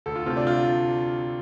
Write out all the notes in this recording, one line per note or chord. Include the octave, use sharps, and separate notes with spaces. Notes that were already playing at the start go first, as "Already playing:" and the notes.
D2 A4
F4
C3 A3 C4 F4
D4
F4